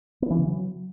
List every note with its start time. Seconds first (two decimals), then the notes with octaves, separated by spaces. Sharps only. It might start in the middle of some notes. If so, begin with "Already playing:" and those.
0.22 B3
0.30 E3
0.39 C#3
0.47 F#3